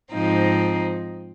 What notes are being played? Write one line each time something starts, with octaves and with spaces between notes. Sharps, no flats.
G#2 F3 C4 D#4